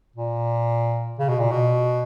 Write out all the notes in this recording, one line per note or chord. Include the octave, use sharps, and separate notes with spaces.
A#2
C#3
B2
A#2
B2